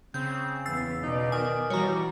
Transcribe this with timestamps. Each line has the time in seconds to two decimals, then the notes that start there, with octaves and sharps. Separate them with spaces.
0.14 C#3 C4 G6
0.66 E2 E3 B3 E6 A6 C7
1.03 B2 D#4 D5
1.32 D#3 G#5
1.70 E3 G3 F#4 C#5 A#5